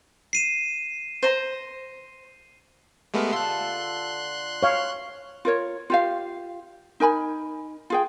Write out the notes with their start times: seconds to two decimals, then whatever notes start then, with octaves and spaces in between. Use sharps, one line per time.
0.33 C7 D#7 E7
1.23 C5 A#5
3.14 G#3 A3 B3 G4 A#4
3.32 D3 F4 A4 C6 F#6
4.63 C#5 F5
5.45 F4 A#4 C#5
5.90 F4 G4 F5
7.00 D#4 A#4 G#5 B5
7.90 F4 G#4 G5